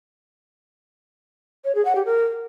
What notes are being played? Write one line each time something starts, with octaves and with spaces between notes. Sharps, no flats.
C#5
G#4
F#5
G4
A#4